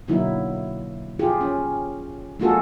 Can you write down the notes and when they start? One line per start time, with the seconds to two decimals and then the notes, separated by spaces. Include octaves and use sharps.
0.08 B2 D3 F#3 A#3 D#4 E4
1.19 F4 G4 G#4
1.41 C#4
2.39 G#3 A#3 F4 F#4 G#4 A4